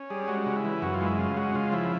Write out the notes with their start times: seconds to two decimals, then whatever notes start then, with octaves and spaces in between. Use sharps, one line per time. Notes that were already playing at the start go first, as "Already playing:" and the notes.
Already playing: C#4
0.10 G3 G#4
0.28 G#3 F#4
0.46 C#3
0.56 E4
0.64 E3
0.82 F#2 F#4
0.94 F4
1.01 G#3
1.06 E4
1.18 C#3 F4
1.36 G#3 F#4
1.55 C#3 F4
1.72 F3 E4